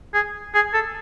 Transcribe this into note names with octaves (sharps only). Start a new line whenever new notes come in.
G#4
G#4
A4